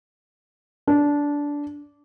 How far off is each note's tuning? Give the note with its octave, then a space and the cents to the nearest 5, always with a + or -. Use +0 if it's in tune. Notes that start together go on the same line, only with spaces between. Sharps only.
D4 -15